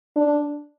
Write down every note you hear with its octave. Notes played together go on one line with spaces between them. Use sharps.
D4